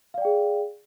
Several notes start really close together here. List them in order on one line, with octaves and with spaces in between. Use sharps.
F5 D5 G5 G#4